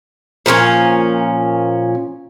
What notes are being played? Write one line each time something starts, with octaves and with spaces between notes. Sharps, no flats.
A#2 F3 A3 C#4